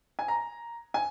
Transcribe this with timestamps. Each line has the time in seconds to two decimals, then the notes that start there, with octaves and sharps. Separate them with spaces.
0.19 G#5
0.28 A#5
0.94 G#5